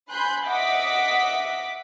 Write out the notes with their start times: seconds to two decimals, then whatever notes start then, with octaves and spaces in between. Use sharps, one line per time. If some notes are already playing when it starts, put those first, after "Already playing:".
0.11 G#5 B5 C6 F#6 G6
0.46 D#5 E5 F#5 D6 B6